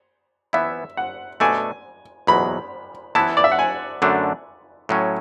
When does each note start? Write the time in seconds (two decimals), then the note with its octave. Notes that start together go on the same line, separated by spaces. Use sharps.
0.53 E3 B3 E4 E5
0.97 F#5
1.40 B2 A3 D4 A4 D5 G#5
2.27 E2 B2 F#3 B5
3.15 E3 B3 E4 A5
3.37 D5
3.44 E5
3.52 F#5
3.59 G#5
4.02 F#2 D3 A3 D4
4.89 A2 F#3 C#4